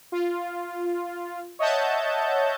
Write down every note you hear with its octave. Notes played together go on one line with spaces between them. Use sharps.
F4
C#5 D#5 E5 F#5 A5 G6